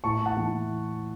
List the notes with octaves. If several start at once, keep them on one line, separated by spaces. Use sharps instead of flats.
A2 A5 C#6
F#5 A5
E3